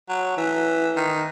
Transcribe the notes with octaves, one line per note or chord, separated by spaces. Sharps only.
F#3
E3
D#3